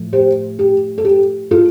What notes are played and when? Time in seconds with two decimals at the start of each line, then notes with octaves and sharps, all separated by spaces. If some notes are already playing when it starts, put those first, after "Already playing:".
Already playing: A2 F3 A3
0.13 G4 C5
0.59 G4
0.98 A4
1.05 G4
1.51 F4 A4